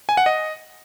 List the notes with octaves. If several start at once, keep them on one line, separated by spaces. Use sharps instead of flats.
G#5
F#5
D#5